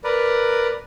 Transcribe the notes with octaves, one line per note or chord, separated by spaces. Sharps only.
A#4 B4 D5